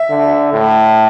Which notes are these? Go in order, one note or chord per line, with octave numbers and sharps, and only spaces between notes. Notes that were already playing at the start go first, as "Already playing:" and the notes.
Already playing: E5
D3
A2